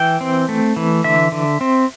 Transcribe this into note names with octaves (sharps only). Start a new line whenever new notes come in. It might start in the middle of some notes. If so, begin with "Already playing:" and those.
Already playing: E3 G5
C4
A3
E3
D3 E5
D3
C4